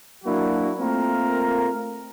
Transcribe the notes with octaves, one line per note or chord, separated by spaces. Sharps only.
F#3 A#3 D4 E4 F#4
A3 A#3 C4 F4 A#4